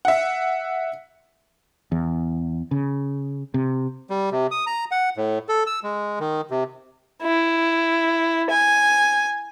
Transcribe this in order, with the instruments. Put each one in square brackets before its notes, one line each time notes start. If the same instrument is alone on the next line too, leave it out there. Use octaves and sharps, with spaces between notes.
[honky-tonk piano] E5 F#5
[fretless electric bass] E2
C#3
C3
[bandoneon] G3
C3
D#6
A#5
F#5
A2
A4
E6
G#3
D#3
C3
[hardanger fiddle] E4
G#5